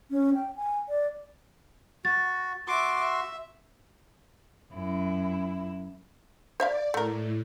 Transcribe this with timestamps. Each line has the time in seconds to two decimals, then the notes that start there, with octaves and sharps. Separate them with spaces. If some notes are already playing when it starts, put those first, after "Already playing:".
0.11 C#4
0.35 G5
0.56 G#5
0.89 D5
2.05 F#4 A6
2.68 F#4 E5 C6 D6
3.00 E5
4.73 F#2 E4
6.60 C5 D5 E5 F5
6.94 A2 A3 A#4